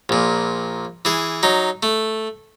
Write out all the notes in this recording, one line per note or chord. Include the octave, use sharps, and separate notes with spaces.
A#1 A#2
E3 G#4
F#3 D#4
A3